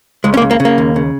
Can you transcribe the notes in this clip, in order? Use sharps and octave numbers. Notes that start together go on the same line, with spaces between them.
C#2 G#3
C#4
A#3
C#3
A#3
C#3
A#3
D#2
C#3